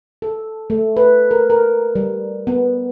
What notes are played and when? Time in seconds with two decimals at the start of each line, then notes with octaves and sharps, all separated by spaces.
0.22 A4
0.70 A3
0.97 B4
1.31 A#4
1.50 A#4
1.95 G3
2.47 B3